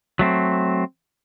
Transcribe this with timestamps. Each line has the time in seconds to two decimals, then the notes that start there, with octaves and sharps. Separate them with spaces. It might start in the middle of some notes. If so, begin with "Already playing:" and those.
0.19 F#3 A3 C4